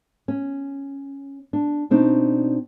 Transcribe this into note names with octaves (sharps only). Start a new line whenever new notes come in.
C#4
D4
B2 C4 D4 D#4